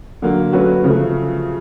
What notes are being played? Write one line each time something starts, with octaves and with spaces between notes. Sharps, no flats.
D3 F#3 A#3
F#3 A3 C#4 F#4 B4
C#3 F3 A3